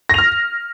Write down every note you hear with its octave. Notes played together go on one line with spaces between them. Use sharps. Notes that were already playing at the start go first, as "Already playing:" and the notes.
F6 A#6 F7